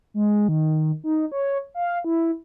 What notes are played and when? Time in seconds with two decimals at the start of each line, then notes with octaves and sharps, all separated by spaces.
0.14 G#3
0.48 D#3
1.04 D#4
1.32 C#5
1.74 F5
2.04 E4